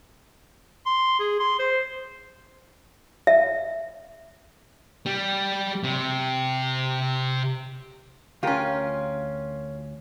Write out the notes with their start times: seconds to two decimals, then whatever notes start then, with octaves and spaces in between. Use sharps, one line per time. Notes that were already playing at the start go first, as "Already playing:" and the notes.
0.86 C6
1.19 G#4
1.40 C6
1.59 C5
3.27 E5
5.06 G3
5.84 C3
8.43 D2 C#4 F4 G4 A#4